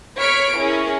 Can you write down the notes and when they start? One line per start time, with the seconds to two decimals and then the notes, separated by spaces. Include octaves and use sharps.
0.18 C#5 B5 C#6 F6 B6 D7
0.57 C#4 E4 G#4 A#4 C#5